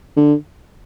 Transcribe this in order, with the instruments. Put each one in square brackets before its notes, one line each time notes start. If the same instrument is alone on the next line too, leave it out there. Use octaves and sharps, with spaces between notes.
[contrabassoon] D3